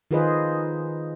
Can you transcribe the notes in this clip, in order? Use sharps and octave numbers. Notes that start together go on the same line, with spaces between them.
D#3 F4 G#4 B4 C5 D#5